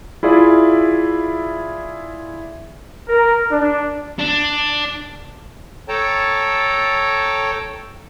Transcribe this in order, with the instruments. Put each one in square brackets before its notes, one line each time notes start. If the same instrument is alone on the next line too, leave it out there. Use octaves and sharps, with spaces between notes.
[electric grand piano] E4 F4 G#4 D5 E5
[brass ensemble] A#4
D4
[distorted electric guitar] D4
[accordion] A4 C#5 G5 A5 A#5